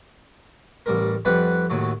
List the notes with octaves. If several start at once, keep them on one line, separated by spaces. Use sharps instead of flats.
A1 G3 A#4
F2 G3 B4 F#5 G5
D#2 A2 F#3